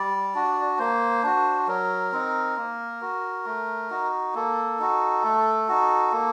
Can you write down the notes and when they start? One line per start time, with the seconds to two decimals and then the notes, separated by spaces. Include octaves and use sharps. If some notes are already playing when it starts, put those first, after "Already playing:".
Already playing: G3 D5
0.35 D4 F#4
0.79 A#3 C5
1.23 D4 F#4
1.67 F#3 A#4
2.12 C4 D#4
2.57 A#3
3.01 F#4
3.46 A3
3.90 D#4 F#4
4.34 A#3 A4
4.79 D#4 F#4
5.24 A3
5.68 D#4 F#4
6.12 A#3